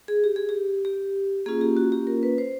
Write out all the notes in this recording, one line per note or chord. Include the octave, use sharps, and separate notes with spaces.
G#4
G4
G#4
G4
G4
A#3 C#4 F4 G#4
G4
F#4
G4
A#4
B4
C5